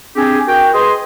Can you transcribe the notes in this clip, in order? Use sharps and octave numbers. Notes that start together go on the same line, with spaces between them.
C4 D4 G4 G#4
F#4 A#4 G5
G#4 B4 D#5 C6